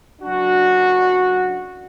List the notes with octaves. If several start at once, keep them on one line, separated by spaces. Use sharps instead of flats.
F#1 F#2 F#3 D4 F#4